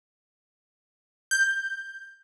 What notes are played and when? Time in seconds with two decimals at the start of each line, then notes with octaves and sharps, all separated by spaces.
1.31 G6